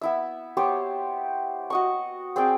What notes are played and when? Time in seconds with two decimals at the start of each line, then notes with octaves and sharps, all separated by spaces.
0.01 B3 E4 E5
0.57 B3 G4 C5 C#5
1.70 F#4 D#5 C#6
2.36 C4 G#4 D5 G5